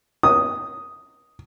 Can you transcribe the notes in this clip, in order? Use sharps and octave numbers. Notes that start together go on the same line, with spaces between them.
D#6